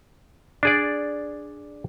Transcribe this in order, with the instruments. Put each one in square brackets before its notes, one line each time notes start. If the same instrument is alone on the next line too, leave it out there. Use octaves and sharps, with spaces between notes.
[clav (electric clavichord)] D4 G#4 D5